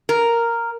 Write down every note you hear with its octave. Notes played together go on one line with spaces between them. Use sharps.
A#4